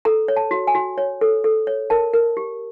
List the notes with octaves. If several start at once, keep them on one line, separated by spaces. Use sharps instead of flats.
A4 A#5
C#5
A5
F#4
G#5
F#4
C#5
A4
A4
C#5
A#4 A5
A#4
G4